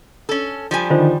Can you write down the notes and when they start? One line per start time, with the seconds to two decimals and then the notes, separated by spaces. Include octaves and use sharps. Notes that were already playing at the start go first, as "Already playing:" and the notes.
0.29 C#4 A4
0.71 F3 G3 G#5
0.90 D3 D#3 D#4 F4 C5